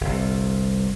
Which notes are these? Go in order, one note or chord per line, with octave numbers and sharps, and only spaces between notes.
G1 C2